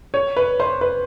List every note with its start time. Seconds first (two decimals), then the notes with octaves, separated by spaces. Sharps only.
0.14 C#5
0.37 B4
0.60 C5
0.81 B4